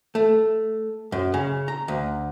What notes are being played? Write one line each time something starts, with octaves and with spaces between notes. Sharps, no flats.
A3
F#2
C#3
A#5
D2